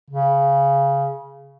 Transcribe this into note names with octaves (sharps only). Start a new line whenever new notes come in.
C#3